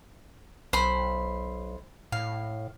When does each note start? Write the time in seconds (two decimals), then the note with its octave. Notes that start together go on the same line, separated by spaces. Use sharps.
0.73 B1 C5 B5
2.12 A2 F5